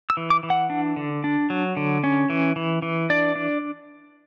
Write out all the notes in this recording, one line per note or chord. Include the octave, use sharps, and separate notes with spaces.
E6
E3
D6
E3
F#5
D4
D3
D4
F#3
D3
C#4
E3
E3
E3
D4 D5
D4